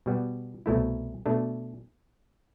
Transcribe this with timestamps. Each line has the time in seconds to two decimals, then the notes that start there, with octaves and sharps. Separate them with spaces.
0.06 B2 G3 B3
0.66 C2 B2 A3 E4
1.26 B2 A3 D4